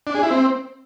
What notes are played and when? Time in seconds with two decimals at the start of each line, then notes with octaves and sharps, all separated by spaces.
0.07 D4
0.15 G#4
0.23 E4
0.31 C4